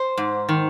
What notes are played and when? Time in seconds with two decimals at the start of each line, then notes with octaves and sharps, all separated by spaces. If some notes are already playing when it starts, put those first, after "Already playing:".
Already playing: C5
0.18 G#2
0.49 D#3